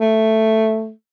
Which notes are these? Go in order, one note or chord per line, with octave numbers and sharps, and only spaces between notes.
A3